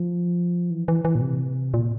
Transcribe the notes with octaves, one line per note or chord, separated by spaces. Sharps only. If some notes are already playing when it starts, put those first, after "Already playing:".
Already playing: F3
E3
E3
E3
A#2
C3
A#2